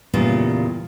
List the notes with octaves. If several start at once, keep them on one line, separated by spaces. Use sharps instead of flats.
E2 A#2 C#3 G3 F4